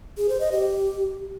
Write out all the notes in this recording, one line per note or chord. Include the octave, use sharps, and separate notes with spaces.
G#4
C5
D#5
G4